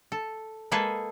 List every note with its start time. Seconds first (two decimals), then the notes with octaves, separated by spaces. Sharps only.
0.12 A4
0.72 G#3 A#3 G#4 A4 B4